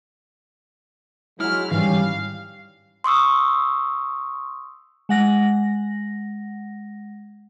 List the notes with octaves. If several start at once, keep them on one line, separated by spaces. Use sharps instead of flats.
F#3 G#3 E4 F6
G#2 D#3 E3 G3 C#4 F5
C6 C#6 D#6 E6
G#3 F#5 A#6